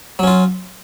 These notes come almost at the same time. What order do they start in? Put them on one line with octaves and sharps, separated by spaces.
F#3 C#4 F4